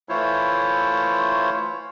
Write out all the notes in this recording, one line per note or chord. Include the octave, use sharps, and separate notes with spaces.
E3 A3 E4 F4 C5 C#5